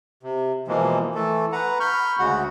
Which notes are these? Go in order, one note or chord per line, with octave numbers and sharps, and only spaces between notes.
C3
B2 E3 F3 G#3 A#3
E3 A3 A4
B4 F#5 A#5
B5 C#6 F6 G6
D2 C#3 G#3 F#4 F#5